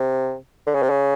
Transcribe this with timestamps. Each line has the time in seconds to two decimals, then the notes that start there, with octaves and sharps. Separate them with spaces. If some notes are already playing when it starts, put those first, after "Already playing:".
Already playing: C3
0.66 D3
0.75 C#3
0.82 C3
0.90 C#3